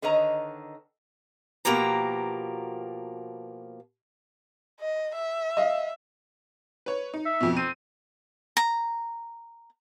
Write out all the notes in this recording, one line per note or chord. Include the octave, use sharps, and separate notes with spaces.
D3 D#3 B4 C#5 D#5 A#5
B2 F3 A#3 G4 A#5
D#5
E5
D#5 F5
B4 C#5
D#4
E5
F2 B2
C4 D#7
A#5